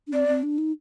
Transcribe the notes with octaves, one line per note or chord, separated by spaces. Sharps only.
D4
C4 D5
C4
D4
D#4